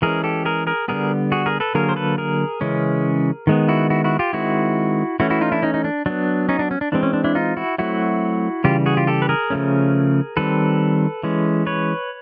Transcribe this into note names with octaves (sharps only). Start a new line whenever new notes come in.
E3 G#3 C#4 G#4 A#4
G4 A4
G#4 A#4
G#4 A#4
D3 G3 B3 G#4 A#4
F#4 G#4
G#4 A#4
A4 B4
D3 F#3 A#3 G#4 A#4
C5
A4 B4
G#4 A#4
C#3 E3 G#3 C#4
D#3 G#3 B3
E4 F#4
E4 F#4
E4 F#4
F4 G4
D#3 G#3 C4 E4 F#4
E3 A3 C#4 E4 F#4
E4 F#4
D#4 F4
D4 E4
C#4 D#4
D#4
D4
F#3 B3 D4
C#4 D#4
D4
C#4
D4
E3 G#3 C4 D4
C#4
D4
D4 E4
D#4 F4
E4 F#4
F#3 A3 C4 E4 F#4
C#3 E3 G3 F4 G4
F#4 G#4
F4 G4
G4 A4
B4
G#4 A#4
C#3 F3 A3 C#4
D#3 G3 C4 A4 B4
E3 G#3 C#4
B4 C#5